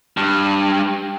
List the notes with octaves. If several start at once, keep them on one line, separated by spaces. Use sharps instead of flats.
G2